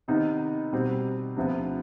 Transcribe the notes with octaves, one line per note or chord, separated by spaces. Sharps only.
C3 D#3 B3 D#4
B2 G3 C4
D2 C3 F3 B3